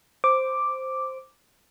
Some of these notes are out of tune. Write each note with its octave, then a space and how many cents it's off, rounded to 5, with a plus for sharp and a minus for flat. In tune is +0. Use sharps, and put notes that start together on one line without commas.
C5 +0 D6 +0